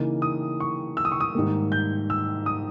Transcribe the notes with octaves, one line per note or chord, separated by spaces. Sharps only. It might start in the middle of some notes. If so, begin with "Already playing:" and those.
Already playing: C#3 E3 A#3 D#4
D#6
C#6
E6
D#6
C#6
D#6
G#2 D#3 G3 A#3
G6
E6
D#6